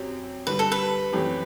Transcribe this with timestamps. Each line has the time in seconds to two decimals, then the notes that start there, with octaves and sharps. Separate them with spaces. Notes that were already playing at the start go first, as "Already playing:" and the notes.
Already playing: F#2 F#3 C4 G4
0.47 G2 D3 G3 B4
0.59 A4
0.72 B4
1.13 F#2 E3 A3 C4 G4